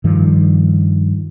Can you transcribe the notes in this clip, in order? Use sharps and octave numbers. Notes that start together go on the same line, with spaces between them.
G2 D#3 F3